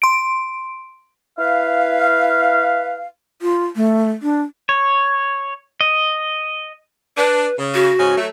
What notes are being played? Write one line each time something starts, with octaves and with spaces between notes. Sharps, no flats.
C6 D7
E4 B4 F5
F4
A3
D4
C#5
D#5
D4 B4
C#3
F#4
G#2 C#3 C#4
F#3 A3